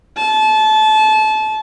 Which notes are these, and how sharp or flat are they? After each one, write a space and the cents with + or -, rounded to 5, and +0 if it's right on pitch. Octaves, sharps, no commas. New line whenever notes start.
A5 -25